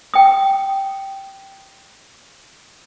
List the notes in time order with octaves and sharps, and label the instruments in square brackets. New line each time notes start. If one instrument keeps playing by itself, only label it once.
[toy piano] G5 D#6